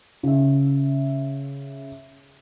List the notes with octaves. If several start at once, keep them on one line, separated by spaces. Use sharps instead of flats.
C#3 E5